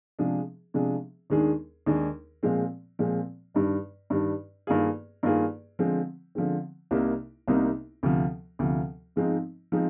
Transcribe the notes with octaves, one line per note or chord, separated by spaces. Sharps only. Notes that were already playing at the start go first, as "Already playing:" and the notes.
C3 F3 G#3 D4 G#4
C3 F3 G#3 D4 G#4
D#2 D#3 G#3 D4 G#4
D#2 D#3 G#3 D4 G#4
A#2 F3 G#3 C4
A#2 F3 G#3 C4
G2 D#3 G3 D4
G2 D#3 G3 D4
G2 D#3 A#3 F4 G#4
G2 D#3 A#3 F4 G#4
D3 F3 G#3 C4
D3 F3 G#3 C4
C2 C3 G3 A#3 D#4
C2 C3 G3 A#3 D#4
D2 C3 F3
D2 C3 F3
G#2 F3 G#3 C4 D#4
F3 G#3 C4 D#4